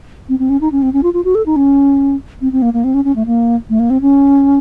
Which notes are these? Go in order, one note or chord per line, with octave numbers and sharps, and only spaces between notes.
C4
C4
C#4
D#4
C#4
C4
C#4
F4
F4
F#4
A4
D#4
C#4
C4
C4
A#3
A#3
C4
C#4
C#4
A3
A#3
A3
A#3
C4
C#4